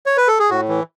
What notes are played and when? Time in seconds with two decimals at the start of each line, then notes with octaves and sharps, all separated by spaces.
0.06 C#5
0.17 B4
0.28 A4
0.39 G#4
0.50 A2 F#4
0.68 E3